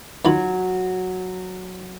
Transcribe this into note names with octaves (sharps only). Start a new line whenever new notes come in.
D#2 F#3 F4 B5